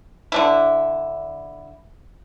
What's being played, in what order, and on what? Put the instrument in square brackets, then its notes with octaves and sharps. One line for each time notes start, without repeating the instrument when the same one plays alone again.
[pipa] D3 D4 E4